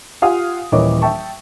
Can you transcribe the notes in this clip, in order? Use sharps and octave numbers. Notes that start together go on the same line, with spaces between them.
F4 G4 F5 F#5 G#5 D#6
D#1 E3 A#4 C#5 D#5 D6
E5 G5 A5 C#6